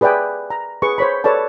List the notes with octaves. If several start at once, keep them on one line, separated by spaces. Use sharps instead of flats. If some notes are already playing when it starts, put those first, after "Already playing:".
G#4 B4 D5 E5 G5 G#5
A#5
G#4 B4 C#6
C5 C#5 B5
A4 B4 C#5 D5 A5